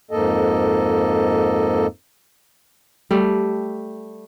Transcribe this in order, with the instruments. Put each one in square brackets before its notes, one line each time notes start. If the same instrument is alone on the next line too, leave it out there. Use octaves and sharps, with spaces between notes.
[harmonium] F2 G#2 A#3 A4 D#5
[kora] G3 A3